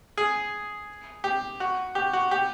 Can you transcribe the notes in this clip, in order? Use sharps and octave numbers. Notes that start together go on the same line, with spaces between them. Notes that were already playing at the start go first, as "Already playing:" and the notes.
G#4
G4
F#4
G4
F#4
G4